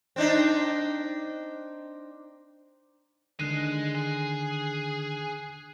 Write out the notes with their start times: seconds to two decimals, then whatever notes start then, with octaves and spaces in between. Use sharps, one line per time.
0.16 C4 D4 D#4
3.40 D3 D#3 G#3 D4 F#6 C7 D#7
3.95 G#4